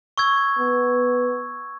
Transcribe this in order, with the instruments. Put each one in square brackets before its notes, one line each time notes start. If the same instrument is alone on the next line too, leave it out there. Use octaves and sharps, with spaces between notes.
[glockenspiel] C#6 E6 G#6
[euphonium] B3